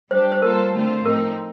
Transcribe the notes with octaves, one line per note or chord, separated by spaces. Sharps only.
G3 D4 G4 C5
C5
G3 A#3 F4 A4 A#4 C5
D3 A3 C4 F4 C5
A2 F3 C4 D#4 A#4